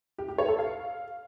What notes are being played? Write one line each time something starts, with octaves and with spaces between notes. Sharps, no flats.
G4
G4
C#5
A4
F5